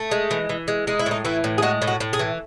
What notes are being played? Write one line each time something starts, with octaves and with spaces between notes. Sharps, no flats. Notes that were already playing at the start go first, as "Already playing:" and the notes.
Already playing: A3
G#3
E3
E3
G#3
G#3 D#4
E4
A2 D#4
E3 E4
A2
G#4
G#3 F#4
A2
F#4
A2
G#4
E3